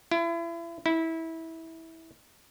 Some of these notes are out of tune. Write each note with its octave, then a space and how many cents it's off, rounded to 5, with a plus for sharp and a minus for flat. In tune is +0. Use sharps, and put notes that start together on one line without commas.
E4 +35
E4 -20